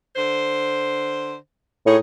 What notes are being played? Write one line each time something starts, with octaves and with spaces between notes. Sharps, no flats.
D3 C5
A2 D#4 G#4 C#5